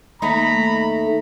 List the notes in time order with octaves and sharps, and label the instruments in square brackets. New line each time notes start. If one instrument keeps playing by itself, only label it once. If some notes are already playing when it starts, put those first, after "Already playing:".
[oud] D#2 A3 D#4 [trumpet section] A#5 B5